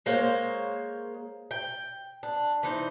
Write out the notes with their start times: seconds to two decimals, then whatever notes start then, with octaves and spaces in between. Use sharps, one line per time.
0.06 G#3 A#3 C5 C#5
1.51 G5
2.23 D4
2.63 E3 D#4 C5